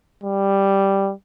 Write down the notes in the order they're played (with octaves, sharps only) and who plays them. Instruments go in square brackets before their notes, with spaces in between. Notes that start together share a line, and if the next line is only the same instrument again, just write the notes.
[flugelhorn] G3